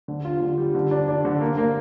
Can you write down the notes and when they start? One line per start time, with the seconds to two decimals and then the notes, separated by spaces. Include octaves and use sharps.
0.08 D3
0.25 F4
0.42 D3
0.58 G3
0.75 D3
0.91 D4
1.08 D4
1.25 D3
1.41 A#3
1.58 A#3